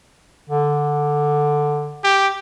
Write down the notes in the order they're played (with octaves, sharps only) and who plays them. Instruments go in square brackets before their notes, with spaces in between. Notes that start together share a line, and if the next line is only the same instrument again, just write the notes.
[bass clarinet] D3
[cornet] G4